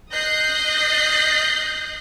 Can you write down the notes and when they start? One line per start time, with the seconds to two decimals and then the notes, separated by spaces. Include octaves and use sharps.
0.12 D#5 D#6 F#6 G6 A#6 C7